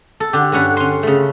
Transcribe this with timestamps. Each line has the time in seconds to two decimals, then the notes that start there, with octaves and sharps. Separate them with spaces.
0.20 A4
0.33 D3 G4
0.52 G2 D3 C#4 F#5 B5
0.77 C#4 C6
1.03 C#3 A3